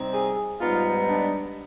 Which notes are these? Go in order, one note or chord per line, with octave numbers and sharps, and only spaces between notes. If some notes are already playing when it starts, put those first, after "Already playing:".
Already playing: C3 G3 C4 D#4
G#4
G#2 G3 B3 D#4 F4
D4